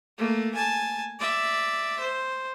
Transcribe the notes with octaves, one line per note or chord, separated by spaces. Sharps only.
A3 A#3
G#5 A5
D5 E5
C5